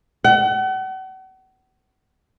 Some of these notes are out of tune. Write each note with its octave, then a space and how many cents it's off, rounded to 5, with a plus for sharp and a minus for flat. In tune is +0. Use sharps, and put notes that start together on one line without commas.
F#5 +40